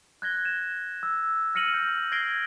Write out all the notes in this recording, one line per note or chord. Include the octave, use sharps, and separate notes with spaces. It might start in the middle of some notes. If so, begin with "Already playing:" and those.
F#6 G#6 A#6 G7
E7
E6
F6 A#6 C#7 D#7 F#7
G6
G#6 A#6 C7 D7 G7